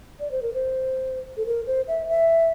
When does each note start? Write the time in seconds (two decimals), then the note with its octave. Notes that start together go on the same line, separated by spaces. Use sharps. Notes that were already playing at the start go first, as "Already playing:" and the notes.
0.20 D5
0.31 C5
0.42 A#4
0.54 C5
1.37 A4
1.46 A#4
1.67 C5
1.88 E5
2.09 E5